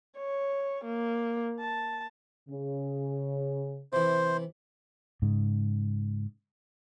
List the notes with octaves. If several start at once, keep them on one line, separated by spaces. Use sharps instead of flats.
C#5
A#3
A5
C#3
C3 E3 C5
G#2 C#3